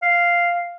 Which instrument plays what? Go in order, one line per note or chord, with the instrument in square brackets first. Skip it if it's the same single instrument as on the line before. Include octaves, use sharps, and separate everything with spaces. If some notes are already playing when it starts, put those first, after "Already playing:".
[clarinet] F5